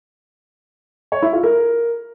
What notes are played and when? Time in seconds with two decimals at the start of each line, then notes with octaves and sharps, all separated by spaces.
1.12 C#5
1.22 E4
1.33 F4
1.43 A#4